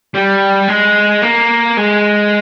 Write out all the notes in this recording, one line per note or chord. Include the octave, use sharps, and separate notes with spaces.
G3
G#3
A#3
G#3